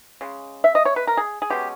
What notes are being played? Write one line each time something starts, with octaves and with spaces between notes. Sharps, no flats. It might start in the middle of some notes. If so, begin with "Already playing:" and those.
C#3 G#3
E5
D#5
C#5
B4
A#4
G#4
G#4
B2 G#3 C#4 G4